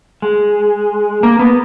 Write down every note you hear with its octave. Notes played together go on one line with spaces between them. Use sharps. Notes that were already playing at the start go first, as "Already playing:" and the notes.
G#3
A#3
B3